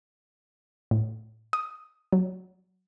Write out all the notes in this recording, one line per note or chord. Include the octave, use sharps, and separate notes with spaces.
A2
D#6
F#3